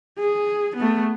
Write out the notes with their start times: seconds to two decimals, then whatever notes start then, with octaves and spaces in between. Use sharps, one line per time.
0.19 G#4
0.77 A3 B3